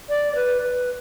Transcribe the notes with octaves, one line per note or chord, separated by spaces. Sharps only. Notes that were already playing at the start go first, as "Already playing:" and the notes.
D5
B4
B4